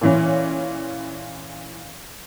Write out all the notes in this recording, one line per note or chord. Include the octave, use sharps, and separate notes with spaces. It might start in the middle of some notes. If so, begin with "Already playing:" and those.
A#2 E3 C#4